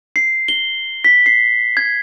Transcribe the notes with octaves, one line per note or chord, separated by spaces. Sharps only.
C7
G7
B6
C7
G#6